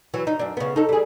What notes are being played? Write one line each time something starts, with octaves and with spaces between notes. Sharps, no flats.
E3 F#3
D#4
F#2 D4
C#3 B3
D#4 A4
G3 G#4